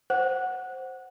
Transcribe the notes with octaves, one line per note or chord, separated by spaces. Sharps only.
C5 F#5